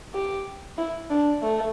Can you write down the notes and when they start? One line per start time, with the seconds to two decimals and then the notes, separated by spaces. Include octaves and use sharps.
0.14 G4
0.78 E4
1.10 D4
1.42 A3